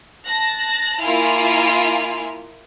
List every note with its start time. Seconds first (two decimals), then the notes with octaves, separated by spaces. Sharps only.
0.25 A5 F#6 A#6
1.00 A#3 E4 F4 G#5 F6